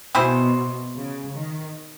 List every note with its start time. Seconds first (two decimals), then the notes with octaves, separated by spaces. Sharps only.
0.14 B2 C4 E4 G#4 C5
0.95 C#3
1.35 D#3